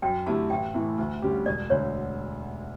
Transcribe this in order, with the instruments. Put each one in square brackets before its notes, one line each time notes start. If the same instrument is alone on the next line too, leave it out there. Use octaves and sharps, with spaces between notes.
[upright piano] F#2 [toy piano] G5
[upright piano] D3 A3 E4 G4 [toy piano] A5
[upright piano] A1 [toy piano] G5
[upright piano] A2 E3 A3 E4
D2
D3 G3 C#4 G4
[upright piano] E1 [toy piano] D5
[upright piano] D2 D3 [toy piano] C#5